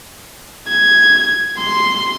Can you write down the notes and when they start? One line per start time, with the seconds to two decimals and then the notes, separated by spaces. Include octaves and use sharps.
0.68 G#6
1.58 C6